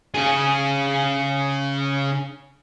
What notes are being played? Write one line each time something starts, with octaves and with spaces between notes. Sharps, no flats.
C#3 G#4